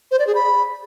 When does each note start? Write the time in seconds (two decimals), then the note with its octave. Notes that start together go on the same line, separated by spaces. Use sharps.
0.11 C5
0.19 D5
0.27 G#4
0.35 B5